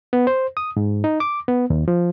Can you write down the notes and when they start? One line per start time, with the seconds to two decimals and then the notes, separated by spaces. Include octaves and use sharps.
0.13 B3
0.27 C5
0.57 D#6
0.77 G#2
1.04 D#4
1.20 D6
1.48 B3
1.70 D#2
1.88 F3